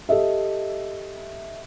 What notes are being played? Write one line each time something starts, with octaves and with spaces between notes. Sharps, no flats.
G4 A4 D#5 E5